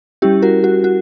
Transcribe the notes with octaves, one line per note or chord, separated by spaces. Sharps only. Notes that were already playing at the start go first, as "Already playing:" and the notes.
G3 C#4 E4 G4
F#4 A#4
F#4
F#4